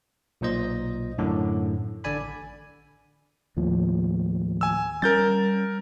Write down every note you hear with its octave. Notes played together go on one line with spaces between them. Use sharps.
B1 A#2 C5 D#5
F#2 A2 D3
A1 D3 D5 G#5 B5
D#2 A2 F3
G#5 E6
G3 C#4 A#4 G6 A6